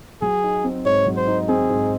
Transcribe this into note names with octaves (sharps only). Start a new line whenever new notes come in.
F#3 G#4
D#4
C4
G#2 C#5
F#3
C5
D#4
C4 G#4
G#2